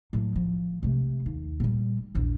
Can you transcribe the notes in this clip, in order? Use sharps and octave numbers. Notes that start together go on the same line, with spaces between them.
A2 F#3
F3
C3 A3
D#2
A#2 G3
A#1 E2